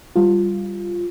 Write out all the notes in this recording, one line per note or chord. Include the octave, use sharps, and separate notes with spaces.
G3 F4